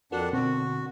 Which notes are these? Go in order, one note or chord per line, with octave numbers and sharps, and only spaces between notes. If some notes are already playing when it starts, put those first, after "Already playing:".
F2 D4 F#4 A4 A#4 F#5
B2 D3 C4 F#4